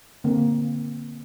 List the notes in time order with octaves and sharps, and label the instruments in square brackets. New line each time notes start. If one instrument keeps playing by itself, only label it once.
[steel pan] D3 A#3 C4